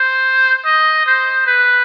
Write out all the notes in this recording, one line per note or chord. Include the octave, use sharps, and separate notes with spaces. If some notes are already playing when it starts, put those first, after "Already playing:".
Already playing: C5
D#5
C5
B4